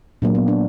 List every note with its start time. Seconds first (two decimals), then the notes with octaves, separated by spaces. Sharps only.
0.22 A#2 F#3 A#3 D4
0.35 B3
0.48 D4